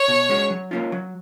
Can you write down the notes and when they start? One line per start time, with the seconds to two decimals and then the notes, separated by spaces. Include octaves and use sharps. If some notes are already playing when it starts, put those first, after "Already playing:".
Already playing: C#5
0.08 B2
0.29 G#3 C#4 F#4
0.50 F#3
0.71 A#3 C#4 F4
0.92 F#3